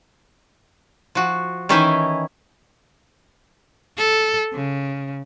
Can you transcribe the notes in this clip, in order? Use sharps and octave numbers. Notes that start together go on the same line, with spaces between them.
F3 F#4
D#3 E3 C#4 E4 G5 G#5
A4
C#3